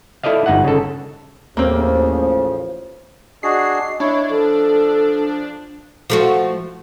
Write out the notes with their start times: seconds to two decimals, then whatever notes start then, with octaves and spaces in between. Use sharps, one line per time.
0.23 E4 A4 D5 D#5 F5
0.46 G1 D#4 F#5
0.64 C#3 A4
1.57 A1 D#2 C#3 F3 A#3 C4
3.43 D4 F#4 G#4 D#5 C7
4.00 D4 E4 C#5
4.30 F3 A4
6.10 F3 A3 F#4